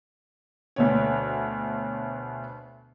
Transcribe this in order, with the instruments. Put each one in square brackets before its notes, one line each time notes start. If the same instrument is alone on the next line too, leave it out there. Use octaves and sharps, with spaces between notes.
[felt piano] D2 B2 C#5